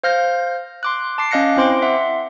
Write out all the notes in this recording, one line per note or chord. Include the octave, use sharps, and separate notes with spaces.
C5 F5 F6 G6 A#6
C6 D6 F#6
A5 D6 C7
C#4 D#5 F5 F#6 A#6 C#7
C4 E4 C5 C6 D6 D7
E5 F#5 C6